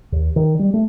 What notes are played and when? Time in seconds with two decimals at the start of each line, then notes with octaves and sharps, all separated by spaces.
0.12 D#2
0.36 D#3
0.59 G3
0.74 A3